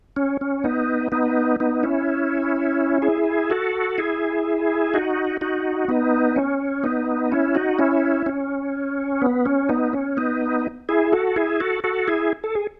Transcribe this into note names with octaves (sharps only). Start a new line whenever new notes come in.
C#4
C#4
B3 D#4
B3 D#4
B3 D#4
C#4 E4
E4 G#4
F#4 A4
E4 G#4
D#4 F#4
D#4 F#4
B3 D#4
C#4
B3 D#4
C#4 E4
D#4 F#4
C#4 E4
C#4
B3
C#4
B3 D#4
C#4
B3 D#4
E4 G#4
F#4 A4
E4 G#4
F#4 A4
F#4 A4
E4 G#4
A4
G#4